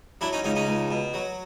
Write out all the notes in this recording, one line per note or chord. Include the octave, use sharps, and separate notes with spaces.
F#3 D4 E4
C#4 D#4
C#2 C#4 D#4
C#4 D#4
C#2
B2
F#3